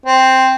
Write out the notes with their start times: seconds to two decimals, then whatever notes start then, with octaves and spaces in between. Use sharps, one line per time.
0.06 C4